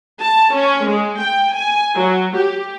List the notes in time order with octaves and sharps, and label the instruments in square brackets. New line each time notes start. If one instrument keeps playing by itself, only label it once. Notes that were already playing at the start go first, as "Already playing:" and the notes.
[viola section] A5
C#4
G#3
G5
G#5
F#3
G4